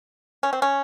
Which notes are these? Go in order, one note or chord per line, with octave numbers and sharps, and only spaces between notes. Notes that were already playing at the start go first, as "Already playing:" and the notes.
C#4
C4
C#4